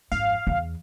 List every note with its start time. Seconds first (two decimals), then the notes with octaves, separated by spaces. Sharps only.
0.12 G#1 F2 F5
0.47 E2